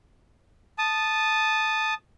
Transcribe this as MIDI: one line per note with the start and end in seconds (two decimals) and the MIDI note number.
0.78 1.94 81
0.78 1.94 87